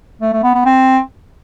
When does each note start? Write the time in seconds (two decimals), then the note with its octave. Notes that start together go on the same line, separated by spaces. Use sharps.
0.22 A3
0.33 A3
0.43 B3
0.54 B3
0.65 C4